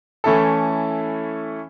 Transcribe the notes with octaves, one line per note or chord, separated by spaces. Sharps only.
E3 A3 C#4 E4 A4